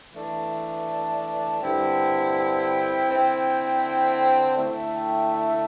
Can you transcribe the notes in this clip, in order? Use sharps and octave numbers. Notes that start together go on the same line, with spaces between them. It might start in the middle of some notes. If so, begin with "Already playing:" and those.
E3 A3 D4 E5
G2 D3 C4 E4 G5
G5
D3 C4 E4
D3 A3 E4
G5
E5